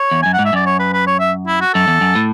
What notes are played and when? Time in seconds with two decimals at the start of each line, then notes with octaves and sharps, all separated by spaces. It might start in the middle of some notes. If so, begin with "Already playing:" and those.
Already playing: C#5
0.11 E2
0.23 F#2 G#5
0.34 F#5
0.39 G#2
0.45 E5
0.53 F#2 D5
0.66 C#5
0.79 B4
0.93 B4
1.07 C#5
1.20 E5
1.47 E4
1.61 F#4
1.74 F#2 A4
1.88 E2
2.01 F#2
2.15 A2